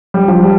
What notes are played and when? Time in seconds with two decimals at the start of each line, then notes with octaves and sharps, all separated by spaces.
0.14 G3
0.28 F3
0.42 G3